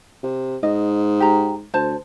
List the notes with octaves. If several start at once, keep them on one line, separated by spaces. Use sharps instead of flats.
C3
G#2 D#5
G4 A#5
D2 C5 A5